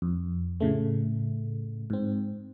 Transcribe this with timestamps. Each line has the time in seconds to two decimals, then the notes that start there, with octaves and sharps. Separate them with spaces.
0.02 F2
0.60 A2 C#3 A3
1.90 G#2 C4